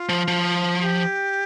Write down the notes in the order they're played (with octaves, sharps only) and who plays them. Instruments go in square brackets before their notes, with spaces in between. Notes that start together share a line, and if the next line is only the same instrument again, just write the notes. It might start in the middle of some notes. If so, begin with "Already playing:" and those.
Already playing: [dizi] F4
[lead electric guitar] F3
F3
[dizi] G4